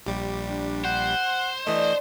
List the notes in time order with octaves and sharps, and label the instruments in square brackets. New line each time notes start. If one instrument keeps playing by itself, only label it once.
[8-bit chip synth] A#1 G3 [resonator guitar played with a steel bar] G4
[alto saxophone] D4
[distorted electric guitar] C5 [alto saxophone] F#5
[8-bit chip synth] E3 A3 [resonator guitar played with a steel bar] D4 [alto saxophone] D#5